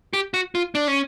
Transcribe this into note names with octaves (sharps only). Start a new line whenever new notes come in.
G4
F#4
F4
D4
C#4